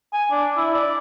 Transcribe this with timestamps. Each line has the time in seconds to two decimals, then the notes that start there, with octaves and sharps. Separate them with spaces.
0.13 G#5
0.31 D4
0.57 E4
0.74 D5